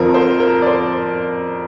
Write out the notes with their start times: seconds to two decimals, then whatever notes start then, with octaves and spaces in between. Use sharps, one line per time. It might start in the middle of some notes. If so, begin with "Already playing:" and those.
Already playing: F2 F3 C4 A#4
0.14 C5
0.40 A#4
0.62 D5
0.66 C5